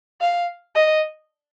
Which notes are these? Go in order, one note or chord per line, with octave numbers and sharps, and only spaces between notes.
F5
D#5